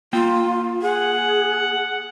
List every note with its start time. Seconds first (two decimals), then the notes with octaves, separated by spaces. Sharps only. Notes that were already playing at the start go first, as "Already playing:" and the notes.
0.13 A#3 F4 G5
0.82 G#4 F#5